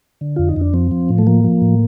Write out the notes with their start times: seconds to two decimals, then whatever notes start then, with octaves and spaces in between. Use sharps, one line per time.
0.21 D3
0.36 F2 F4
0.49 D#4
0.56 F2 D4
0.74 F3 C4
0.91 F3
1.09 A2
1.18 A3
1.27 F3 A#3
1.44 F3
1.62 A2